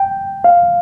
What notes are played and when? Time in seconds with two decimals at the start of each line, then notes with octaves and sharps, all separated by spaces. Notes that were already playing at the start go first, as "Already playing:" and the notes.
Already playing: G5
0.44 F5